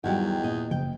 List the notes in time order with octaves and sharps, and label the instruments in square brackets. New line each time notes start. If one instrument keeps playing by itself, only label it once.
[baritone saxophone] E2 [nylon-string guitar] D#3 F#3 G3 [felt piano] F#5 G5
[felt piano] A#2 [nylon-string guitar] D#5
[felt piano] F#1 [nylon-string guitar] G5